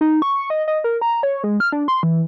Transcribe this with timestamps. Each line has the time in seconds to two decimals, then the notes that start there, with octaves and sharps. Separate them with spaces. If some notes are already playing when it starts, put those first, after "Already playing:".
0.01 D#4
0.22 C#6
0.50 D#5
0.68 D#5
0.84 A#4
1.01 A#5
1.23 C#5
1.44 G#3
1.60 F6
1.72 D4
1.88 C6
2.03 E3